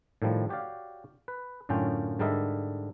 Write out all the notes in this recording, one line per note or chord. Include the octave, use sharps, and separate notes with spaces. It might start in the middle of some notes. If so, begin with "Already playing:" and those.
A2 D#3 F3 G3
F#4 G4 C#5 D5 F5
B4
F#2 A2 D3 C#4 F4 G5
G#2 D3 G3 A#4 D#5 E5